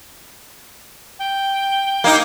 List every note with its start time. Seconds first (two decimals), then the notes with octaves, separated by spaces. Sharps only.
1.19 G5
2.04 A#3 D#4